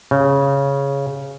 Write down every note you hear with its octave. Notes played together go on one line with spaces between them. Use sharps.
C#3